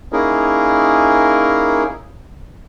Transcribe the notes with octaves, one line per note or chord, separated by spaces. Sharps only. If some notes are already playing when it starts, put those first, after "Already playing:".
A#3 C#4 D#4 E4 G#4 A#4